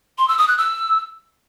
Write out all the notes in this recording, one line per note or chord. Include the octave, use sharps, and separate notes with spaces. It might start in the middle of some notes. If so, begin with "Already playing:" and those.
C6
E6
D#6
F#6
E6